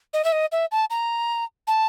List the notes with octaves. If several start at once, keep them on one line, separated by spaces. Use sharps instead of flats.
D#5
E5
D#5
E5
A5
A#5
A5